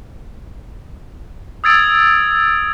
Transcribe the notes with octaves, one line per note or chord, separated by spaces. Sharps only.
D#6 E6 G#6 A6 D7